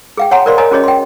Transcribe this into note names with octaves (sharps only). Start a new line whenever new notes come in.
G#4 F5 G5
C#5 F#5 G#5 A#5 C6
A#4 C5 D5 F5 C6
A#4 C#5 D#5 G#5 A#5
C#4 F#4 G#4 C#5 D#5
G5 C6